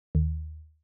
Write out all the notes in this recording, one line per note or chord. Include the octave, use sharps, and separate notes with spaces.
D#2